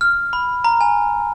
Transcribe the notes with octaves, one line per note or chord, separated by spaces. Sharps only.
F6
B5
A#5
G#5